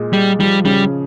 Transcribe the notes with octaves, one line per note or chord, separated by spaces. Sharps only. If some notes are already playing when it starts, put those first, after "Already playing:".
Already playing: A#2 G#3
G3 G#3
F3 G3
C#3 G3